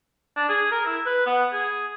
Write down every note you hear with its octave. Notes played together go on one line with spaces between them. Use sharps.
D4
G#4
A#4
E4
B4
B3
G#4